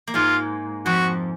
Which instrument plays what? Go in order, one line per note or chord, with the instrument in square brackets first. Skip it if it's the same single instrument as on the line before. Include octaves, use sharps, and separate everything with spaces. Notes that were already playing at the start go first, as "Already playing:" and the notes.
[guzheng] A#3
[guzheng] G#2 G#3 [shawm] F4
[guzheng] F2 F3 [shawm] F#4